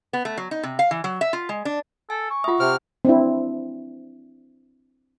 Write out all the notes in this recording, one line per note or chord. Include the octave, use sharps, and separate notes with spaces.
B3
A3
F#3
D#4
C3
F5
E3
F#3
E5
F4
G#3
D4
A4 G#5
C#6
F4 E5 F#5 D#6
C3 C5 G5 F6
C4 D4 E4